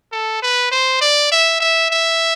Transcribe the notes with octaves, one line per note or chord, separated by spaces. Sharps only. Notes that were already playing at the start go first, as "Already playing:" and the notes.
A4
B4
C5
D5
E5
E5
E5